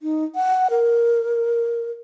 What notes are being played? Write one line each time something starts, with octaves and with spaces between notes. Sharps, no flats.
D#4
F#5
A#4